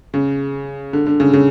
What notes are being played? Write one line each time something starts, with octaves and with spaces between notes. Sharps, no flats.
C#3
D3
D3
C#3
C#3